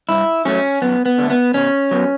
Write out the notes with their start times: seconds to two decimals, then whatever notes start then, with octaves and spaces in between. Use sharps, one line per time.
0.09 G2 E4
0.45 F#3 A3 C#4
0.82 F#2 B3
1.06 B3
1.18 D3 A3
1.30 B3
1.54 B2 C#4
1.91 F#3 B3